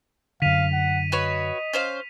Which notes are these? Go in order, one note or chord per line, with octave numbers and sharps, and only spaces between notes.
F#2 D3 F5 B6 D#7 F7
F#5
F#4 B4 C#5 D#5
C#4 C5 F5